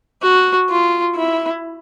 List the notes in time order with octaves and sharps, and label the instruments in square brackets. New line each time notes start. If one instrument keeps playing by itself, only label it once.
[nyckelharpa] F#4
F4
E4